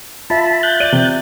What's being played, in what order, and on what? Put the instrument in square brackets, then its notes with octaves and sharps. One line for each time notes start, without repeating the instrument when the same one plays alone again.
[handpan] F4 E5 [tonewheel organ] A5 B5
[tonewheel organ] F#6 G6 A6
[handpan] D5 [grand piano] D#7
[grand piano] C3